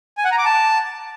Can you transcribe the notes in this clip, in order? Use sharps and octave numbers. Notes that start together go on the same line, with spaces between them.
G#5
F#5
A#5
D6
A5